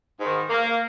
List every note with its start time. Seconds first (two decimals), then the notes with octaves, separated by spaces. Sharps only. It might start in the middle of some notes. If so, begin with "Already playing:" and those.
0.20 G#2 D#3
0.49 A#3